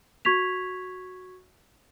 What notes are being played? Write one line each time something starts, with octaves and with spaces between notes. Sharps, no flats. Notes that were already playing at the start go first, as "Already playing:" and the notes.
F#4 C#6 G#6 B6 F7